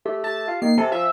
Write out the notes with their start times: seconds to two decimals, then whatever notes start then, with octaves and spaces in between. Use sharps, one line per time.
0.06 A3 G4
0.24 G4 A5
0.48 F4
0.62 D#3 A#3 C7
0.78 C3 A4 G#5
0.92 F3 E5 E6